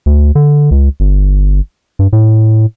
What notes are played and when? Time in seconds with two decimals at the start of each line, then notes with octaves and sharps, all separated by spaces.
0.06 D2
0.35 D3
0.71 C#2
1.00 G1
1.99 G2
2.13 A2